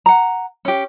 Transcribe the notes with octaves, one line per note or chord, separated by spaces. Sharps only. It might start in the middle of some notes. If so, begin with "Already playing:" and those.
F#5 A#5
C#4 G4